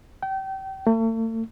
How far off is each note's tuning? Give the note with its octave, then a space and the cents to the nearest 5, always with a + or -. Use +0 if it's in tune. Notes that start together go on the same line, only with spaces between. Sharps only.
G5 -30
A3 +40